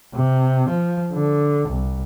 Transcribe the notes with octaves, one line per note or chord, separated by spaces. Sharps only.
C3
F3
D3
C2